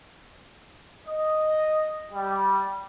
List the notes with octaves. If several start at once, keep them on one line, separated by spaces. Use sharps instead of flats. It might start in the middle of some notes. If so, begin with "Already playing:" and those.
D#5
G3